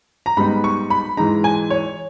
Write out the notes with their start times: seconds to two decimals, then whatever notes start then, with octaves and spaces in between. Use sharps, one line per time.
0.26 A#5
0.37 G#2 G3 B3 D#4 B5
0.64 C#6
0.90 B5
1.17 G#2 E3 G#3 D#4 A#5
1.44 G#5
1.70 C#5